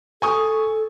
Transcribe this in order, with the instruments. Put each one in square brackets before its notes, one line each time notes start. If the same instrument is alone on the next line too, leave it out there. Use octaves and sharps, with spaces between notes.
[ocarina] A4 [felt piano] G#5 C#6 D#6